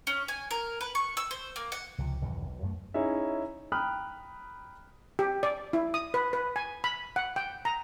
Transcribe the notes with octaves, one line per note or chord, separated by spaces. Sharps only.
C#4
G#5
A#4
B4
C#6
E6
C5
A#3
F#5
C#2 C3 F3
B1 E2 G2 D#3
B1
F#2 A3
C#4 D#4 E4 G#4 E5
G5 A#5 B5 D#6 F6 F#6
G4
D5
E4
D#6
B4
B4
G#5
B5
F#5
G5
A#5